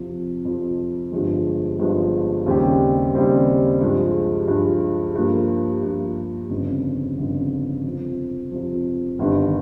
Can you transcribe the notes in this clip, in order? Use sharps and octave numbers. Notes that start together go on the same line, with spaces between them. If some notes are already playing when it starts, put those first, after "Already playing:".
Already playing: F2 C3 F3
F2 C3 F3
G1 G2 F3 G#3
G1 G2 F3 G#3
D#2 C#3 G3 C4 G4
D#2 C#3 G3 C4 G4
G2 F3 G#3
G2 F3 G#3
G2 F3 A#3
G2 F3 A#3
G1 F2 C#3
G1 F2 C#3
F2 C3 F3
F2 C3 F3
G1 G2 D#3